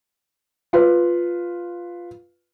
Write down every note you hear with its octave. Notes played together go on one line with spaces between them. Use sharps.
F4 B4